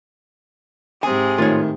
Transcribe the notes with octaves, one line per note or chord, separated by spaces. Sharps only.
G#2 C3 G#4 G#5
A2 D#3 F4 C#5